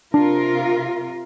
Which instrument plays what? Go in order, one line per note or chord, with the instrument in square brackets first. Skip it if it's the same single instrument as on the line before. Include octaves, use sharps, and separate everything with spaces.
[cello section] C3 F4 A#4 [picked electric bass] D4